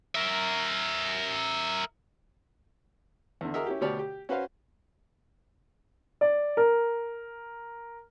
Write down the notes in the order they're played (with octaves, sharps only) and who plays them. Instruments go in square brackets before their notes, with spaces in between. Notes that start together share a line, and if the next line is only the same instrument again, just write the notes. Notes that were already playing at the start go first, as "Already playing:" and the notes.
[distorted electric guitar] A#4 E5
[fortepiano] E2 D3
F#4 G#4 A#4 D#5 E5
C#4 E4 G4
D2 B2 G4 C#5 D5 F6
G4
C#4 F#4 B4 C5 F5
[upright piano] D5
A#4